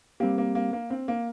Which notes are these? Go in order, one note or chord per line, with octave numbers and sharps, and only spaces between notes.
G3 A#3 C4 G4
A#3
A#3
A#3
C4
A#3